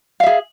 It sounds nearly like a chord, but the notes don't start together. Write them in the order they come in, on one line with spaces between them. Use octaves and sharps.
F5 E5 G#4